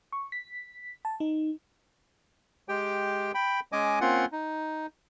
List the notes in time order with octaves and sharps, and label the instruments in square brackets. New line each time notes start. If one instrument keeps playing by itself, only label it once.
[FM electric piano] C#6
B6
A5
D#4
[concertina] G#3 G4 G5
G5 B5
G#3 C#4 D#5 G#5 D6
A#3 C4 C#4 F4 F#5
D#4